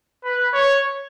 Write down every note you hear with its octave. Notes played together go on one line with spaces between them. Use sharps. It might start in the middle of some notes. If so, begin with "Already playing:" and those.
B4
C#5